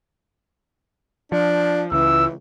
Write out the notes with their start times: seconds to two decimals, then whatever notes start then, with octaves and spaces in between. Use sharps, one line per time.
1.32 F3 D4
1.92 C#2 E3 E6